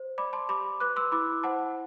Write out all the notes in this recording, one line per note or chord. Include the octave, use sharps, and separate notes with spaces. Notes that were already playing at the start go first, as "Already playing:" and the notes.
Already playing: C5
D5 B5 D6
A5 C6
G4 B5 D6
B4 D6 F#6
C6 E6
E4 B5 D6
C5 F#5 A5